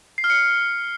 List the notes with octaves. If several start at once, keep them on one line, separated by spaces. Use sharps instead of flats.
C7
F6
C#7